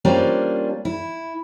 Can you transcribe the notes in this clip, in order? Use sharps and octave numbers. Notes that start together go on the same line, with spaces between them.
G3 A#3 C#4 D4 F4 C5
E4